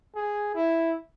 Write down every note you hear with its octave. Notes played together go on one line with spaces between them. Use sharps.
G#4
E4